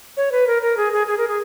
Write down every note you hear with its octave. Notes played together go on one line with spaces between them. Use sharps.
C#5
B4
A#4
A#4
G#4
G#4
G#4
A#4
G#4